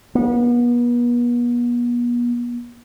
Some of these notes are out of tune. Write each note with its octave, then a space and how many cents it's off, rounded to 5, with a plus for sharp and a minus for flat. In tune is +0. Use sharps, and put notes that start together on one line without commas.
B3 -40